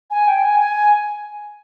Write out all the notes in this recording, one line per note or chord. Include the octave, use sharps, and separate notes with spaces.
G#5
G5
G#5
G#5